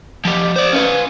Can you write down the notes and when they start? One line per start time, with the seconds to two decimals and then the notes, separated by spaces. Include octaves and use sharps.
0.25 F3 G4
0.56 C5 D5
0.73 C#4 B4